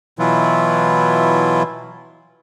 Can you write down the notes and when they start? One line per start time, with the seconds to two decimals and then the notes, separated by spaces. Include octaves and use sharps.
0.19 B2 E3 F#3 E4 F4